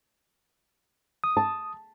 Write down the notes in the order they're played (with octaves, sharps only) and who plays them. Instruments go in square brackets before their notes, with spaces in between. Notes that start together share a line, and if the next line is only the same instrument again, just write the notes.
[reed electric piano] D#6
[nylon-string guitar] A5